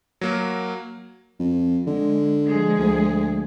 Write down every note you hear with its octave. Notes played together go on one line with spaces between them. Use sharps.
F#3 A#3 A#4
F2
D3 G#3
F3 G#3 G#4
D2